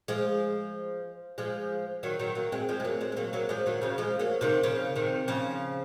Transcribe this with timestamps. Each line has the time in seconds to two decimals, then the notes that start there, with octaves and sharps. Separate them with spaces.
0.08 F3 G#3
1.38 F3 G#3
2.03 D#3 F#3
2.19 D#3 F#3
2.35 F#3 A#3
2.52 G#3 C4
2.69 F3 G#3
2.80 G#3
2.85 F#3 A#3
3.01 G#3 C4
3.12 G#3
3.17 F#3 A#3
3.33 F#3 A#3
3.49 F3 G#3
3.66 D#3 F#3
3.82 C#3 F3
3.98 F3 G#3
4.19 F#3 A#3
4.41 C3 D#3
4.63 C#3 F3
4.96 C3 D#3
5.28 C#3 F3